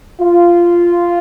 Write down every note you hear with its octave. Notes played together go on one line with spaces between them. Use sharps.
F4